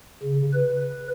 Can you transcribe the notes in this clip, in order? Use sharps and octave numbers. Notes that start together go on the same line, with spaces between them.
C#3
B4